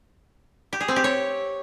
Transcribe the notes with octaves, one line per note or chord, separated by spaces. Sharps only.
G4
G#4
C4
G4
C#5